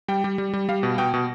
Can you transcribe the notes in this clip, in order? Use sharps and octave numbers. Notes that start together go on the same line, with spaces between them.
G3 G5
G3
G3
G3
G3 F5
B2
B2 G5
B2